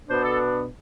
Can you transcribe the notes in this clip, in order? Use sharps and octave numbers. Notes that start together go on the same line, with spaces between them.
B2 B3 D4 C5
A4